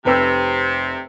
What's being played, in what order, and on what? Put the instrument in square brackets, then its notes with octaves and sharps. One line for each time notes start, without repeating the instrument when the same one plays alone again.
[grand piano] F1 B4 E6 [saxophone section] C3